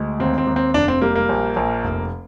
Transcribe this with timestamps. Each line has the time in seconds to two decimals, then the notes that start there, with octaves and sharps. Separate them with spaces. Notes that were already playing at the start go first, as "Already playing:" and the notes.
Already playing: D2 G#3
0.20 D#2 C4
0.38 C4
0.47 D#2
0.56 C4
0.74 F1 D4
0.88 C4
1.01 G3 A#3
1.15 A#3
1.29 A#1
1.56 A#1
1.84 F1